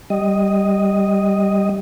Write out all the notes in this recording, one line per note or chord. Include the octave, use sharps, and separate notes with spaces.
G3 D#5